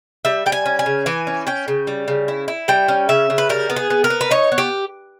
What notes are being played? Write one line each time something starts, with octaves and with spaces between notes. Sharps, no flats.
G3 E5
G3 G5
G#5
C#4
G#5
C#3
E3 G#5
C#4
C#4 G5
C#3
G3
C#3
E4
E4
G3 G5
C#4
C#3 E5
C#3
B4
G3 A#4
B3
G#4
B3
A#4
B3
B4
D#4 C#5
B3
G4